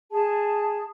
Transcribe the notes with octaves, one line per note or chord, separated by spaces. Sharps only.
G#4 A5